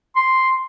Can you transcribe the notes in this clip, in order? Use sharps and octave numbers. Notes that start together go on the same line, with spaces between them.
C6